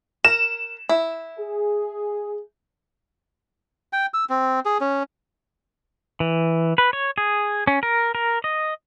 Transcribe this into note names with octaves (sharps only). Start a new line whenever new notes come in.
A#4 E7
E4
G#4
G5
E6
C4
G#4
C#4
E3
B4
C#5
G#4
C#4
A#4
A#4
D#5